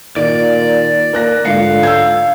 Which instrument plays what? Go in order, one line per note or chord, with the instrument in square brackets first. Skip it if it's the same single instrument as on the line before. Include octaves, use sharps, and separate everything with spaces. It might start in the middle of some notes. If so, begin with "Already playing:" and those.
[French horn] A#2 [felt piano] D#3 [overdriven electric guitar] D5
[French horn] A#3 [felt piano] A#4 F#6 A#6
[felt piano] G#2 F4 C#7 [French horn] D3 [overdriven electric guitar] F5
[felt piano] E6 G6 G#6